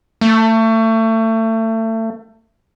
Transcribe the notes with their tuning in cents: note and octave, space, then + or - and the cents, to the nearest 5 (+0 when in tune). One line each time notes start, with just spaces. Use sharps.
A3 +30